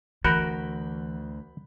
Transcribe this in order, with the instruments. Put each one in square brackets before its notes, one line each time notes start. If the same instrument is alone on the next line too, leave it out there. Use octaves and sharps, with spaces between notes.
[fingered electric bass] D2 [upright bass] E3 [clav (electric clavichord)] F#4 A#4 [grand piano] B5 F#6 G6